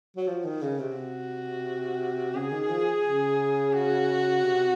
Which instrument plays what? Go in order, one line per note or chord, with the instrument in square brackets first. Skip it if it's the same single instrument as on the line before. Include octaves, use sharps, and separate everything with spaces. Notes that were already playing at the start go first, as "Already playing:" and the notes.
[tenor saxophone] F#3
F3
D#3
C#3
C3
[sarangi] F#4
[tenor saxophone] C#3 [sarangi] G#4
[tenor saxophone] D#3
F3
C#3
[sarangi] F#4
[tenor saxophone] C3